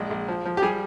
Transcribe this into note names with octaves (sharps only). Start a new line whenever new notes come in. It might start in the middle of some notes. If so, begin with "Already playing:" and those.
Already playing: A#1 G#3
A#1
F3
F3
G4
G3 G#4